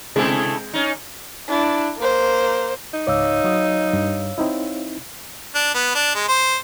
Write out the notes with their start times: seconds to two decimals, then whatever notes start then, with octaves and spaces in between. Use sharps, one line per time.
0.16 C3 G#3 A3 C4 E4
0.74 C#4 D#4
1.48 D4 E4
1.98 A#3 C5
2.93 D#4
3.07 C#2 G#2 C#5 F5 D6 E6
3.44 F#3 F#4 D#6
3.93 G2
4.38 C4 D#4 E4
5.55 D4
5.74 B3
5.95 D4
6.15 G#3
6.29 C5